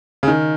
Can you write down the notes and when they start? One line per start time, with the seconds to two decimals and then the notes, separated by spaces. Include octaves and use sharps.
0.23 C#3
0.28 D#3